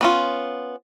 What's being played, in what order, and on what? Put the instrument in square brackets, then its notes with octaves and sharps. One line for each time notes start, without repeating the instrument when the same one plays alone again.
[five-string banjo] B3 C#4 F4